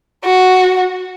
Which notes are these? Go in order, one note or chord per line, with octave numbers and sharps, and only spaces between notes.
F#4